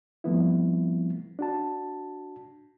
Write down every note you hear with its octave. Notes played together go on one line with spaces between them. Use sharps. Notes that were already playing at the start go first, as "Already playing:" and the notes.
F3 G3 A3 B3 C4 E4
D4 F#4 A5